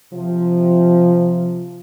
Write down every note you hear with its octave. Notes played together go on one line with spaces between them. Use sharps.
C3 F3